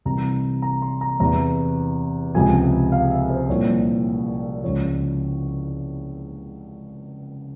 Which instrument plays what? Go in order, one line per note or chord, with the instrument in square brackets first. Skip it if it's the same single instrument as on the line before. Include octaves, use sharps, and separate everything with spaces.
[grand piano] C2 C3 E3 A#5
A#5
C6
A#5
E2 C3 E3 A#5
C#2 C3 F3 G#5
F5
E5
C5
C2 A#2 F3 C#5
C#2 C#3 F3 C#5